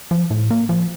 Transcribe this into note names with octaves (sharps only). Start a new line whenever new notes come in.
F3
A2
A#3
F3